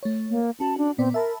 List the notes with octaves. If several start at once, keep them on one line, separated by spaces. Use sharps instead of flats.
A3 C#5
A#3
C#4 F#4 A5
D4
A#2 B3 C4 D5
A#4 E5 A5 B5